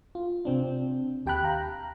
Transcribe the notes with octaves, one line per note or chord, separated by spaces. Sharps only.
F4
C3 C4 D4
D#2 G4 G5 A5 B5 F#6
F5 A#5